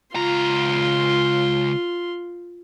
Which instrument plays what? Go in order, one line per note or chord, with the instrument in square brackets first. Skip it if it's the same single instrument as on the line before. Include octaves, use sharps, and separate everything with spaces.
[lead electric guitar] C#2 A#5 [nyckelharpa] F4 C6